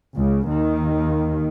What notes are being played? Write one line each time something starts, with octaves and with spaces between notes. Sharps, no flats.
C#2 C#3
D#2 D#3